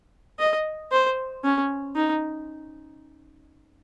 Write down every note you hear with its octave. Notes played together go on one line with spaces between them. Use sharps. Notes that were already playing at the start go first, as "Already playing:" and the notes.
D#5
C5
C#4
D#4